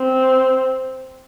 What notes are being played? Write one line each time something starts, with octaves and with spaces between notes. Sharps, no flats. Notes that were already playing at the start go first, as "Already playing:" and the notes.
Already playing: C4